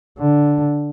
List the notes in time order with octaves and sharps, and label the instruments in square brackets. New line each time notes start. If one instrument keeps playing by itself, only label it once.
[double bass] D3